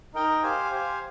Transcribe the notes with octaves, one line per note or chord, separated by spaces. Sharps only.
D#4 A#4 D#5 G5
G4 C5 F5 G#5
G4 C5 F5 G#5